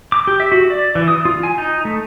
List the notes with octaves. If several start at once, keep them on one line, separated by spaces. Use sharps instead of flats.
D6
G4
E5
F#4
D5
E3
D#6
F4
G#5
D#4
A3